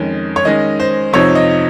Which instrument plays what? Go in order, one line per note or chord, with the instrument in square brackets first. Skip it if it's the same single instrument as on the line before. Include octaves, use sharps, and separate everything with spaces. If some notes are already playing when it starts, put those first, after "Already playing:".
Already playing: [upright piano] F2 D#3 G#3 C#4
C#5
D#3 G#3 C#4 D#5
C5
F2 C3 F3 C4 D#4 C#5
D#5